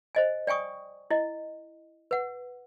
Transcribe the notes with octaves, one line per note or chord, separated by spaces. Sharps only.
C5 D#5 G#5
D5 G5 G#5 C#6 D#6
E4 D#5
B4 F#5